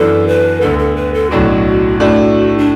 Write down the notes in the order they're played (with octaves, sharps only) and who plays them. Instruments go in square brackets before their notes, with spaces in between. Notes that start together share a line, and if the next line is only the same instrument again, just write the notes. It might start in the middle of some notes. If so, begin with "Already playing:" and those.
Already playing: [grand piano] F#2 E3 B3 D4 [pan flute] A4
[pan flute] B4
[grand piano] D2 D3 B3 [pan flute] A4
[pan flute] A4
B4
A4
[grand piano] B1 A2 F#3 D4 [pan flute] F#4
[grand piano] A2 A3 D4
[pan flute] D4